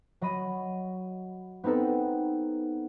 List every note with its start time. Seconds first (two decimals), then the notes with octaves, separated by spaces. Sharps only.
0.21 F#3 D#5 B5 D#7
1.64 B3 C4 D#4 A4 B4